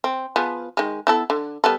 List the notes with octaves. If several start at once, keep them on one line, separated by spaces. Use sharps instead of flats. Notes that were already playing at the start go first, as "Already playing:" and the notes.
C4
F3 B3 G#4
D#3 G#3
B3 E4 A4
D3
G3 B3 A4